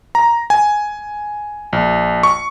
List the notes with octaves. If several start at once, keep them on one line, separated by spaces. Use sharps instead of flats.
A#5
G#5
A#1
C#6